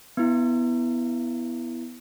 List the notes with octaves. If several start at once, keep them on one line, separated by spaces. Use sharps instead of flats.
B3 E4